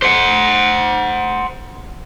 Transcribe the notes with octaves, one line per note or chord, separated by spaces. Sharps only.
C5 F#5